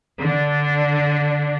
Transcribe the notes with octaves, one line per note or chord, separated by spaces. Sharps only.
D3 D4